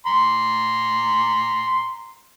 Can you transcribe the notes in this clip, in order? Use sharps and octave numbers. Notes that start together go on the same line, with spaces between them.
A#5 C6